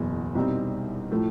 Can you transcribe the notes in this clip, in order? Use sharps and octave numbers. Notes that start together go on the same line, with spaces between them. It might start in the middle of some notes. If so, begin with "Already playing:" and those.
Already playing: F#1 E2 B2 F#3
C2 B2 G3 C4 D#4
A2 F3 A3